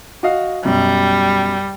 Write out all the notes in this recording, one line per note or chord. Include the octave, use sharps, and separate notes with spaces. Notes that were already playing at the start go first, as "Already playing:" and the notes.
F#4 D#5 F5
F#2 B2 G3